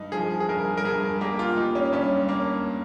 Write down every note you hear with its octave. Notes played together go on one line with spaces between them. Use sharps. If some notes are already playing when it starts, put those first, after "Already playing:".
Already playing: G2 D#4
F3 G#4
G#4
G2 A#4
A#4
G2 G#4
A#3 G4
F4
A#3 D#4
C#4
G2 C#4
A#3